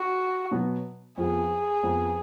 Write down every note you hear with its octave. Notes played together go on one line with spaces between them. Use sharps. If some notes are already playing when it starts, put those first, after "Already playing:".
Already playing: F#4
B2 F#3 B3
F2 F3 B3 G#4
F2 F3 B3